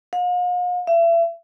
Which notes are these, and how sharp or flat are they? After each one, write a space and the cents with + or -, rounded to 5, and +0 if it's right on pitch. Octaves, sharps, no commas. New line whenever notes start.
F5 +45
E5 +35